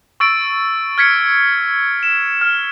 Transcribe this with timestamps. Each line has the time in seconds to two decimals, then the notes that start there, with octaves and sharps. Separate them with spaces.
0.20 C#6 E6 A6 D7
0.98 F6 G#6 B6 C#7
2.03 E7
2.41 F6